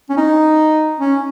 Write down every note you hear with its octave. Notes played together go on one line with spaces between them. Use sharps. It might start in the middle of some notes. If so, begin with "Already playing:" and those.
C#4
D#4
C#4